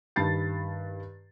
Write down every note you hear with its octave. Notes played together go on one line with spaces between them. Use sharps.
G2 D#3 A5 B5 A6 C7